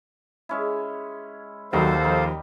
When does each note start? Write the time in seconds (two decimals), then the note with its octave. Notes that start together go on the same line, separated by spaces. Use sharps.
0.49 G#3 C#4 E4
1.73 D#2 F#3 G3 D#4 F#4 A4 C5 F5
2.04 F3 D#4 G4